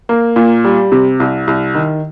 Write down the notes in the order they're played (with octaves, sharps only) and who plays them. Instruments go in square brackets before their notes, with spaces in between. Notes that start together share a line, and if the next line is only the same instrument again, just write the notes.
[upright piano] A#3
A#2
G3
C3
C2
C2
D#3